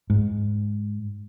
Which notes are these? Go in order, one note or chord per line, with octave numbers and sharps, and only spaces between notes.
G#2